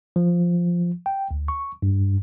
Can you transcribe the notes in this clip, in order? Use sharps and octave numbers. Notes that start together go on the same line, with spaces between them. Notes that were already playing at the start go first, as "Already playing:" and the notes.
F3
G5
D2
C#6
G2